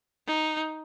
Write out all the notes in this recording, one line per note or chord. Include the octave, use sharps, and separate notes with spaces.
D#4